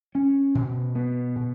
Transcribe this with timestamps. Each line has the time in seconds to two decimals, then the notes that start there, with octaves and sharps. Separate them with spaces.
0.15 C#4
0.55 B2
0.95 B3
1.36 B2